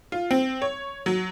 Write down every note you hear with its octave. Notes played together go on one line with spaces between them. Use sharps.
F4
C4
C#5
F#3